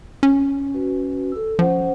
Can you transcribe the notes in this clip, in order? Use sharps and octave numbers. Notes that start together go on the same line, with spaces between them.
C#4
F#4 B4
A4 E6
F3 C#4 C5 F#5